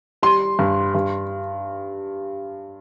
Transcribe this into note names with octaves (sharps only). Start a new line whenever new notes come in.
G3 C6
G2
G2